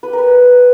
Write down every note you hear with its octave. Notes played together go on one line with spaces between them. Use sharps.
B4
G4
A#4
B4
C#5